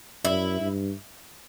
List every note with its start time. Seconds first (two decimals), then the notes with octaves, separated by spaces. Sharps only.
0.24 F#2 E4
0.60 G2